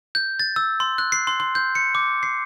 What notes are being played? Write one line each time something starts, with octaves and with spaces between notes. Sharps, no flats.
G6
A6
E6
C6
F#6
C7
C6
C6
G6
C#7
D6
C7